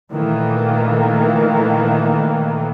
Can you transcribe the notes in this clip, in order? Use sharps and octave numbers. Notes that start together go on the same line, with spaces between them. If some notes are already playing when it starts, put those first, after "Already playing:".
A#2 D#3 E3 A3 A#3